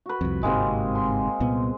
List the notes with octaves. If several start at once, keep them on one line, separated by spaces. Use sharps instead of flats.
F#4 B4
C2 F2
G1 G#2 C3 G#3 A#3 C4
C6
C2 A#2 B3